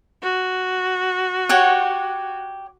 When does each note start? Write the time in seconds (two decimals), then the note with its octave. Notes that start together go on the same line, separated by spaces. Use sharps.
0.22 F#4
1.49 G4 C#5 F#5